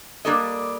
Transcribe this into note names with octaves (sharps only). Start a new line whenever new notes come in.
G3 A#3 D4 A4 D#5